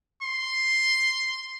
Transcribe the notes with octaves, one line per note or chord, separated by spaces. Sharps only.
C6